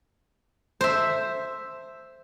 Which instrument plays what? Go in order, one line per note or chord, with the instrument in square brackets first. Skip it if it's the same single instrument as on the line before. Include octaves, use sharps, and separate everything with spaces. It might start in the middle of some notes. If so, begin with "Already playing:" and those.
[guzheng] C5 E5